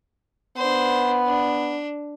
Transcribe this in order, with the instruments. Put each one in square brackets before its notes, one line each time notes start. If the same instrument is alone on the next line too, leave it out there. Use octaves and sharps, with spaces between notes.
[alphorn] B3 [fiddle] D4 C5
[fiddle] D4